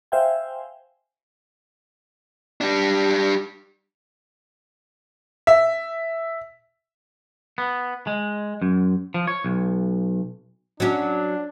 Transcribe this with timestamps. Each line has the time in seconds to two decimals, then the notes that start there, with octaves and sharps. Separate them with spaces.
0.12 C5 E5 F5 G5 G#5
2.61 G3 D4
5.47 E5
7.58 B3
8.07 G#3
8.62 F#2
9.14 F3
9.27 C#5
9.45 B1
10.80 F#3 C#4 D4